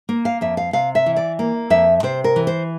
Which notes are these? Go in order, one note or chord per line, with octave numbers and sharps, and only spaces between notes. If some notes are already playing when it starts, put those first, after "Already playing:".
A#3
F5
F2 E5
F5
C3 F5
E5
E3
D5
A#3
F2 E5
C3 C5
A#4
E3
C5